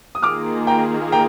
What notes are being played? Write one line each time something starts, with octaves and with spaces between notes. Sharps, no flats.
D#6
D#3 A#3 F4 G#4 D6 F6
G5 A#5
G5 A#5